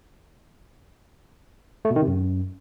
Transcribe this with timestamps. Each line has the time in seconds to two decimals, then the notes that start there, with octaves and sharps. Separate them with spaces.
1.85 A3
1.90 B2
1.96 D#3
2.02 C3
2.07 F#2